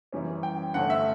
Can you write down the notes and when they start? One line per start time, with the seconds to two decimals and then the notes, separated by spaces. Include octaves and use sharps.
0.13 F#2 E3 G3 C#4
0.43 G5
0.74 G2 D3 A3 C#4 F#5
0.90 E5